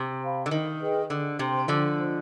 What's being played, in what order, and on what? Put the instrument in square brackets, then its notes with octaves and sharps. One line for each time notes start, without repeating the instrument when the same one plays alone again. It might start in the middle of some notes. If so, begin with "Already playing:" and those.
Already playing: [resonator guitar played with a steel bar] C3
[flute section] C5 F5 B5
[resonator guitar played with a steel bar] D3
D#3
[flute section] G#4 B4 D#5 G5
[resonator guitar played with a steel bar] D3
[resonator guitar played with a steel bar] C3 [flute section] C5 G5 C6
[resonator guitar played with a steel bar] D3 F3
[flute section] F4 C5 D#5